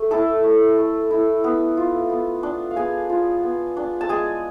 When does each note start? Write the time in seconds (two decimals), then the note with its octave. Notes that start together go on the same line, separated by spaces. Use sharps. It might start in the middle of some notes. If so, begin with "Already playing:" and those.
Already playing: A3
0.11 E4 A4 A5
0.44 A3
0.78 A3
1.11 E4
1.44 B3
1.77 F4
2.10 B3
2.43 D4
2.71 F5
2.76 B3 G#4 G#5
3.09 F4
3.43 B3
3.77 D4
4.01 A5
4.09 G#3 G#4 G#5